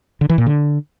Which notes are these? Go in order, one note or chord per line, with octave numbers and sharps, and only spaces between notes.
D3
E3
A#2
D3